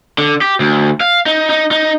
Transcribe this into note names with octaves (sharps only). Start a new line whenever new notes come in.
D3
G4
D2
F5
D#4
D#4
D#4